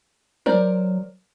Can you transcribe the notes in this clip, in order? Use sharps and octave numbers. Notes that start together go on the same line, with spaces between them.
F#3 A#4 C5 D5